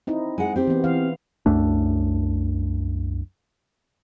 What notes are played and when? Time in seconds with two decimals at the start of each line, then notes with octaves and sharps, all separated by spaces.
0.07 C4 D#4 E4
0.38 G#3 F#5
0.56 C4 G4
0.67 E3 B3
0.84 E3 F5
1.46 C2 F#2 A3 D4